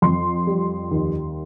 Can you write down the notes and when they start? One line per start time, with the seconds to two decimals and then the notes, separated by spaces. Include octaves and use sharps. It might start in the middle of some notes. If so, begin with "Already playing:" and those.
0.02 F2 C6
0.47 G3
0.91 D#2